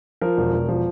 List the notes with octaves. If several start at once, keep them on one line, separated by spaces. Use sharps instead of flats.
F3 A#4
E1
E1
F3